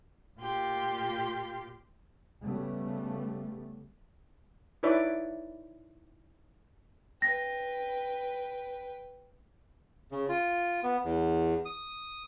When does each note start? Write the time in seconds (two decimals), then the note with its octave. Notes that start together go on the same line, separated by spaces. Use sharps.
0.40 A#2 F4 G4 C6
2.42 C#3 G3 A3 B3
4.83 D#4 E4 B4 C#5 D5 E5
7.22 B4 G5 A#6
10.12 C#3
10.29 F4
10.83 B3
11.04 E2
11.65 D#6